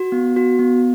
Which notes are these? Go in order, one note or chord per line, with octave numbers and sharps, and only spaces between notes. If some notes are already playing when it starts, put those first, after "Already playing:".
Already playing: F#4
B3
F#4
B3